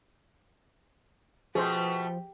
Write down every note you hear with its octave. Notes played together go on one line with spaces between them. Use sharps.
B2 F3 A3 G4 G#4 C5